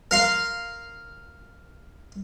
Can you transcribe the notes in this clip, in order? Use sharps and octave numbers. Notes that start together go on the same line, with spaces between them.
A#4 F5 C6